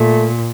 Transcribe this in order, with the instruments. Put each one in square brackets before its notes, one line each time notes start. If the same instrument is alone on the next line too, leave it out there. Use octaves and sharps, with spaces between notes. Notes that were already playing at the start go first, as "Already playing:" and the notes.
Already playing: [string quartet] A#2 [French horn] A3